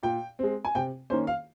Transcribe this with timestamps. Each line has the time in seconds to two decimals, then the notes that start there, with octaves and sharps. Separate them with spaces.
0.03 A#2 G5
0.39 G#3 C4
0.65 G#5
0.75 C3 G5
1.10 D#3 A#3 C#4 C5
1.27 F5